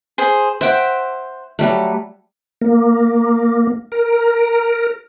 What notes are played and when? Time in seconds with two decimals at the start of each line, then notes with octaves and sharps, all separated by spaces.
0.18 G#4 C5
0.61 C5 E5 F#5 G5
1.59 F#3 G3 A3
2.62 A#3
3.92 A#4